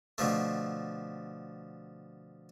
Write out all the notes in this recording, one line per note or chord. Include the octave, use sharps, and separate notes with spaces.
B2 D3 F3 A3